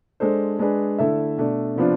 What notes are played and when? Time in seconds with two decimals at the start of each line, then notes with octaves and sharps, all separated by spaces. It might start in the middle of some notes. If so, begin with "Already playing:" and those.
0.20 G#3 D4 A4 C5
0.59 G#3 D4 G#4 B4
0.98 D3 A3 E4 A4 E5
1.38 B2 A3 D4
1.76 C3 F3 B3 D4 F4